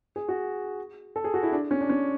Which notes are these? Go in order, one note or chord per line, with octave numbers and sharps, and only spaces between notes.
G#4
F#4
A4
G#4
F#4
E4
D4
C#4
D4
C#4